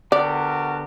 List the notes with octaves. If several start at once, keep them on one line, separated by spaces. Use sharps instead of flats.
D3 B3 F#4 G4 A#4 D5 A5